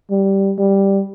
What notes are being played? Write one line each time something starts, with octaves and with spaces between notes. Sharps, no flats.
G3
G3